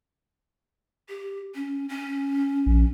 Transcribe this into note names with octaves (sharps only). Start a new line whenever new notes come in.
G4
C#4
C#4
A#1